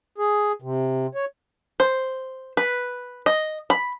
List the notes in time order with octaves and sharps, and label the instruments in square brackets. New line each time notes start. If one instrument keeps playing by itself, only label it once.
[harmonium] G#4
C3
C#5
[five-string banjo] C5
B4
D#5
B5